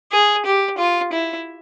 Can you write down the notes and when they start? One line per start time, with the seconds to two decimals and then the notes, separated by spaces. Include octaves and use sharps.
0.13 G#4
0.46 G4
0.78 F4
1.13 E4